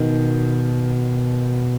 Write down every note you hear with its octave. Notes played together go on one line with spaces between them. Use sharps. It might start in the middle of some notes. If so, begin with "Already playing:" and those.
Already playing: B2 D#3